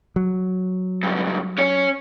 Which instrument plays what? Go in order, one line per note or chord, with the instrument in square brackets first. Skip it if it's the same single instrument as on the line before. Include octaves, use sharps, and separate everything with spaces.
[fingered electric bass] F#3
[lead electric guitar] C#2 G2
C#4 C#5